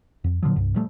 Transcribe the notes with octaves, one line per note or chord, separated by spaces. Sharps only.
F2
A#2 D3 F3 F#3
C2 G2
A#2 F3 G3 A3